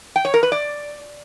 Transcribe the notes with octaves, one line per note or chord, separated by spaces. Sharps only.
G5
C#5
A#4
B4
D5